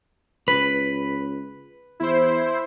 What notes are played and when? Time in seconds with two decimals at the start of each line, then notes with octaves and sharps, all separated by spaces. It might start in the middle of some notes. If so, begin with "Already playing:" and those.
0.48 C#2 B4
2.00 E2 E4 C5